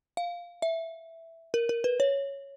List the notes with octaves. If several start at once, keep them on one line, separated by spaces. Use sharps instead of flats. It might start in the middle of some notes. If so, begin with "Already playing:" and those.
F5
E5
A#4
A#4
B4
C#5